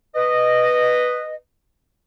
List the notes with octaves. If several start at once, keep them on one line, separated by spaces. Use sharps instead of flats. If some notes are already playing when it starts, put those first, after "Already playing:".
B4 D#5